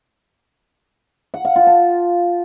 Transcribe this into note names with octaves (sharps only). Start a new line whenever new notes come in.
F#5
F5
F4
A5